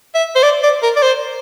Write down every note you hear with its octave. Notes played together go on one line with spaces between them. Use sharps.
E5
C5
D5
D5
A#4
D5
C5